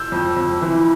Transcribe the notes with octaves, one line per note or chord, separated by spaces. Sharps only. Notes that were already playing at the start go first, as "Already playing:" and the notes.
Already playing: E6 G6
F2
F2
E3